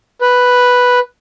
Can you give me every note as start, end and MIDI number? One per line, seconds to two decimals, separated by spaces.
0.21 0.99 71